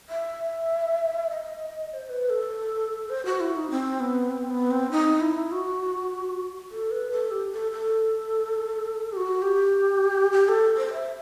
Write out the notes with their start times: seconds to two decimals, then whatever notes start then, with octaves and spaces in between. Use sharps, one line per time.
0.09 E5
1.30 D#5
1.90 D#5
1.93 C5
2.09 B4
2.30 A4
3.10 C5
3.26 F#4
3.40 E4
3.56 D#4
3.71 C4
4.00 B3
4.31 C4
4.50 B3
4.71 C4
4.91 D#4
5.21 E4
5.52 F#4
6.71 A4
6.91 B4
7.11 A4
7.31 G4
7.52 A4
7.72 A4
9.12 G4
9.17 F#4
9.42 G4
10.32 G4
10.49 A4
10.77 C5
10.93 E5